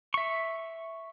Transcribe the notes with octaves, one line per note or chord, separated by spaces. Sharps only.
E5 C#6